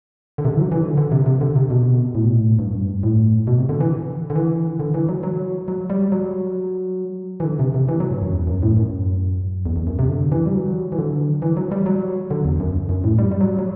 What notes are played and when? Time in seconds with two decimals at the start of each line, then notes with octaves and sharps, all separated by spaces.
0.38 D3
0.45 C3
0.49 D3
0.56 E3
0.60 F#3
0.72 E3
0.82 D3
0.97 D3
1.12 C3
1.26 C3
1.41 D3
1.56 C3
1.70 B2
2.15 A2
2.25 B2
2.35 A2
2.59 G2
2.67 F#2
2.74 G2
3.03 A2
3.47 B2
3.58 C3
3.69 D3
3.80 E3
4.30 D3
4.35 E3
4.80 D3
4.94 E3
5.09 F#3
5.23 F#3
5.68 F#3
5.90 G3
6.12 F#3
7.40 E3
7.44 D3
7.59 C3
7.74 C3
7.88 E3
8.00 F#3
8.11 G2
8.22 F#2
8.32 E2
8.47 F#2
8.62 A2
8.77 F#2
9.66 E2
9.76 E2
9.87 F#2
9.99 C3
10.09 D3
10.32 E3
10.46 G3
10.54 F#3
10.92 E3
10.98 D3
11.42 E3
11.57 F#3
11.71 G3
11.86 F#3
12.31 D3
12.45 E2
12.60 F#2
12.89 F#2
13.04 A2
13.18 G3
13.32 G3
13.41 F#3
13.59 F#3